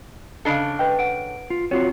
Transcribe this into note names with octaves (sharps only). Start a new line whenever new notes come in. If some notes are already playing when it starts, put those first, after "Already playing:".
C#3 D4 A4 D#5 F5
B4 D#5 G5
F#5 D7
F4
C4 F4 F#4 C#5